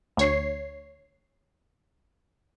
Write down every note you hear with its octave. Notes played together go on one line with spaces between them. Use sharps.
D2 C#5 C7